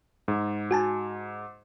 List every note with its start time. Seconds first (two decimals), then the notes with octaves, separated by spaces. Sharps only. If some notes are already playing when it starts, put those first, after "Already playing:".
0.28 G#2
0.71 F#4 G#5 A5